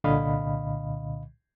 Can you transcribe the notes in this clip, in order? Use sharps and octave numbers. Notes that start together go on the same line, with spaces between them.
C2 A#2 D3 D#5 F5 B5